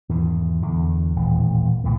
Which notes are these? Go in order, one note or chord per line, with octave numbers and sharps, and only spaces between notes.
E2 G#2 D#3
E2 D3
D#1 A1 E2
F#1 C2 A2 A3